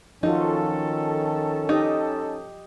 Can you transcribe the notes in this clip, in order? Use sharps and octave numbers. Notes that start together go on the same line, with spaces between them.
D#3 F3 C#4 D#4 F4 F#4 A4
D#4 G4 D#5